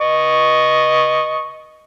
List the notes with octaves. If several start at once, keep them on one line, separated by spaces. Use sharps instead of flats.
D#5 C#6